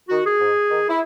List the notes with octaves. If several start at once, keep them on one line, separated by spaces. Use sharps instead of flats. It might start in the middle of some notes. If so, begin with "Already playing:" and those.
D#3 F#4
G#4
G#2
D#3
E4